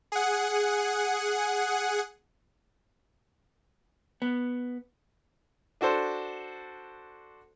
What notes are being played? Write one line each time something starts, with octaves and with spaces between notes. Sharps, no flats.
G#4 F#5
B3
D4 F#4 A4 C5